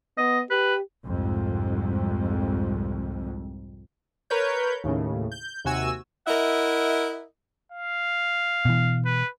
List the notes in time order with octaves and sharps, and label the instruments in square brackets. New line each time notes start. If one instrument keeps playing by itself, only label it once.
[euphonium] B3 [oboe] D#5
[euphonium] G4 [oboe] B4
[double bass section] C2 F2 G#2
[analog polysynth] A#4 B4 C#5 G6
D#2 A2 C#3
G6
D#2 C3 F#4 G#5 E6
[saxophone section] E4 A#4 D#5 E5 F#5
[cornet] F5
[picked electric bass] B2 E3
[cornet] B4